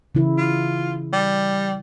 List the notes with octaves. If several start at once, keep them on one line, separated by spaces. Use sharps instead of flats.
C#3 E3 E4
F4
G3